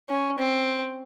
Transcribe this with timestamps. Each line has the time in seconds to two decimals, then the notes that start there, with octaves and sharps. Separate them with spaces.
0.09 C#4
0.39 C4